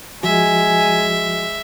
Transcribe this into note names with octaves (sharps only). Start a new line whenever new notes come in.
F3 G#3 F#4 E5 G#5